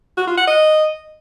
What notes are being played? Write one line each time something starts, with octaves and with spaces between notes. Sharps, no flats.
F#4
F4
F#5
D#5